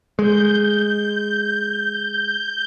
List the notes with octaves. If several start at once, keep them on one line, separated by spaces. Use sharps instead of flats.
G#3 G6